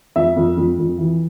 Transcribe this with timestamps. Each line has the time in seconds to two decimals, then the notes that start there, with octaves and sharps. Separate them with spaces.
0.16 F2 E5
0.36 F2
0.57 F2
0.78 F2
0.98 E3